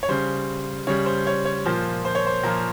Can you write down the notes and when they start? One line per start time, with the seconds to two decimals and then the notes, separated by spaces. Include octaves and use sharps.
0.03 C#5
0.08 C#3 G3 C5
0.87 C#3 G3 C#5
1.06 C5
1.27 C#5
1.45 C#5
1.66 A#2 F3 C5
2.05 C5
2.15 C#5
2.27 C5
2.44 A#2 F3 A#4